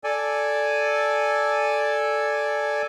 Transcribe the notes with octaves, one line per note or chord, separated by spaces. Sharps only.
A4 D5 G#5